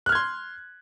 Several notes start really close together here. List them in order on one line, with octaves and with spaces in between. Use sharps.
F#6 F6 G#6 C6